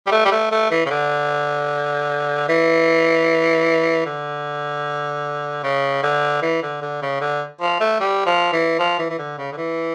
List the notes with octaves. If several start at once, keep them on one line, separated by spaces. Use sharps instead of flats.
G3
A3
G3
A3
A3
E3
C#3
D3
E3
D3
C#3
D3
E3
D3
D3
C#3
D3
F3
A3
G3
F3
E3
F3
E3
E3
D3
C#3
D3
E3